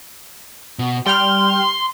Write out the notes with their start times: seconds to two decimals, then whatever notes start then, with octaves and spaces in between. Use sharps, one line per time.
0.79 B2
1.06 G3 G5 C6 F6